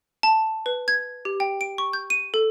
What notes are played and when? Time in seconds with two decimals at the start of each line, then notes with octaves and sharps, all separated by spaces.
0.23 A5
0.66 B4
0.88 G#6
1.25 G4
1.40 G5
1.61 D7
1.78 C#6
1.93 G6
2.10 D#7
2.34 A4